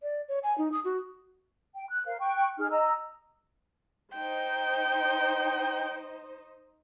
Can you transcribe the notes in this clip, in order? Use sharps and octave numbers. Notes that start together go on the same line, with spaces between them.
D5
C#5
G#5
D#4
D#6
F#4
G5
F#6
A#4 C5 F5
G5 C#6 F#6
D#4 G#4 F6
D#5 A#5 E6
D#4 C5 D#5 G5